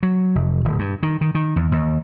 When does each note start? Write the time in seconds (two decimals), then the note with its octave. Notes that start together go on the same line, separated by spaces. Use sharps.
0.03 F#3
0.35 F1
0.64 D1
0.79 G2
1.03 D#3
1.21 D#3
1.35 D#3
1.56 E2
1.72 D#2